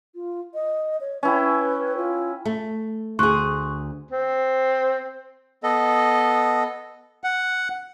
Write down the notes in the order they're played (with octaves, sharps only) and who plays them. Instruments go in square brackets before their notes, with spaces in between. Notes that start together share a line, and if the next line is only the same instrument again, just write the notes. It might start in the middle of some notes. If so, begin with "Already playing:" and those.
[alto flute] F4
D#5
C#5
[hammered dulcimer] C#4 E4 G5 [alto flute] B4
[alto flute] F4
[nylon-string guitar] A3
[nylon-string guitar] D2 G#4 [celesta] C6 C#6 F#6
[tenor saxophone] C4
[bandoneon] B3 A4 D#5
F#5